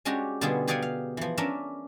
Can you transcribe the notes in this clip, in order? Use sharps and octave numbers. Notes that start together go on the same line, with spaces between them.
G#3 C#4 D4 F#4 G4
B2 D3 G3 B3 F4 G#4
G4 G#4 D5 F5 F#5 G#5
F5
E3 F3
C#4 D4 A#4 E5